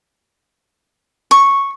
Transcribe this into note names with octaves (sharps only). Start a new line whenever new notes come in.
C#6